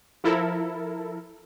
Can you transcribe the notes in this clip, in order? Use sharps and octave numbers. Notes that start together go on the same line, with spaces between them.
F3 E4 A4 A#4